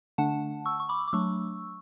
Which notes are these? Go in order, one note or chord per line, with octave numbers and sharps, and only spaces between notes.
D3 A3 D4 F#5 A5
C#6 E6
C#6
B5 D6
D6
F#3 A3 D4 C#6 E6